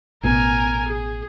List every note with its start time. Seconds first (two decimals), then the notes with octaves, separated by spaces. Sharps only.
0.23 A1 B2 A#4 G#5
0.88 G#4